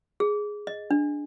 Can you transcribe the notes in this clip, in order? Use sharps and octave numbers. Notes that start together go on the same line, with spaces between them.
G#4
D#5
D4